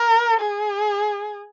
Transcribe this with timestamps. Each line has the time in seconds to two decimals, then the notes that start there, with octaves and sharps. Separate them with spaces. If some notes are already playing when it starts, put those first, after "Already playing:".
Already playing: A#4
0.40 G#4